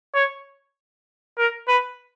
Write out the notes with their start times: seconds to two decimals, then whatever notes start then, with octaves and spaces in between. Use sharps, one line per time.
0.15 C#5
1.38 A#4
1.68 B4